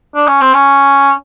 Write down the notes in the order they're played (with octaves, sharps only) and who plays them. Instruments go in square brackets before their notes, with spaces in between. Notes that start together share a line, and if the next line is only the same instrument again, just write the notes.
[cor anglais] D4
C#4
C4
C#4